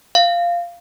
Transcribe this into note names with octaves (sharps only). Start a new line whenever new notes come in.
F5